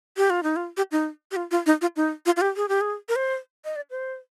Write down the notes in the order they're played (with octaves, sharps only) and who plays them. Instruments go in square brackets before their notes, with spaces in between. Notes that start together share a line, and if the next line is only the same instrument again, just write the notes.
[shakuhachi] G4
F4
D#4
F4
G4
D#4
G4
F4
F4
D#4
F4
D#4
F4
F4
G4
G#4
G4
G#4
A#4
C5
D#5
D5
C5